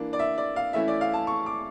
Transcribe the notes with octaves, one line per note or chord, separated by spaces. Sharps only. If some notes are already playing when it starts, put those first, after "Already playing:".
Already playing: E3 A#3 D4
D5
E5
D5
F5
E3 A3 C#4 E4 E5
D5
F5
A5
C#6
D6